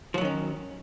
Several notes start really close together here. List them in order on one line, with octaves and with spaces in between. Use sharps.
F3 F#3 D#3 C#4